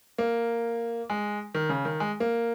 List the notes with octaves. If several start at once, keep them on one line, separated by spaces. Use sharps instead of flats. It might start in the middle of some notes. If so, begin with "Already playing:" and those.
A#3
G#3
D#3
C#3
D#3
G#3
A#3